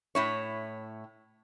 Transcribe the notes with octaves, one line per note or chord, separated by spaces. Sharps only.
A2 E4 C#5